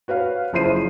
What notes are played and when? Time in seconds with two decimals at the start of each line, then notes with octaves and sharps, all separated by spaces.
0.08 F#4 B4 C#5 F5
0.53 F#1 F3 E4 C5 C7 D#7